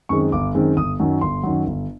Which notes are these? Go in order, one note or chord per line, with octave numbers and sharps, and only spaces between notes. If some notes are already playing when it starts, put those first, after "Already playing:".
F#2 D#3 G#3 C4 C#6
G1 D6
F#2 D#3 G#3 C4
G1 D#6
F#2 D#3 F#3
G1 C6
F#2 D#3 F#3
G1